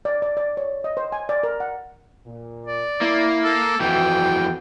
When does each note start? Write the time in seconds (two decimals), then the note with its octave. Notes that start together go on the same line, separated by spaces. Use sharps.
0.05 D5
0.22 D5
0.37 D5
0.57 C#5
0.84 D#5
0.97 C5
1.12 G#5
1.29 D5
1.43 A#4
1.60 F#5
2.26 A#2
2.66 D5
3.01 A#3 E4
3.44 A4
3.81 F2 E3 F#4 G5